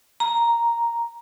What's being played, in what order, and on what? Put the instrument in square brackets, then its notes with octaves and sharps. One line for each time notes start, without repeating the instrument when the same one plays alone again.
[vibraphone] A#5